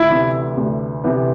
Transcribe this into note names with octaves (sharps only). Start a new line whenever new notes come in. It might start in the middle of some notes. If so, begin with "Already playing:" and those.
Already playing: D2 E4
C3 E3 B3
D2
C3 E3 B3